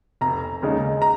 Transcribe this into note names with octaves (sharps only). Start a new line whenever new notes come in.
F1 A#5
D#2 C#3 G#3 D#4
A#5